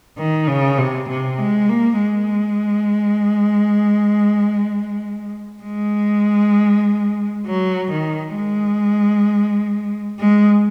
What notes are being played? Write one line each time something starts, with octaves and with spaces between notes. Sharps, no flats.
D#3
C#3
C3
C3
G#3
A#3
G#3
G#3
F#3
D#3
G#3
G#3